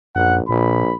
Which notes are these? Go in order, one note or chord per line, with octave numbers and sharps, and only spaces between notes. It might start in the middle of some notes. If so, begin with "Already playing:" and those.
A#1 F#2 F#5
A#1 A#2 B5